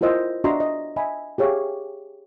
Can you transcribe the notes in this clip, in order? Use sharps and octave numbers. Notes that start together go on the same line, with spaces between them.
E4 F4 A#4 C5 D#5 E6
D4 F#4 D#5 E5 A#5 C6
D#5
D#5 E5 G#5 B5
G4 G#4 C#5 E5 F5